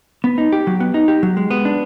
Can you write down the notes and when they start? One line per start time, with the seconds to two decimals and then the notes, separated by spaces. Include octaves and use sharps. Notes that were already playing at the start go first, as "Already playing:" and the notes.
0.24 B3
0.38 D#4
0.53 G4
0.67 F#3
0.80 B3
0.94 D#4
1.08 G4
1.23 F#3
1.37 G#3
1.51 B3
1.65 D4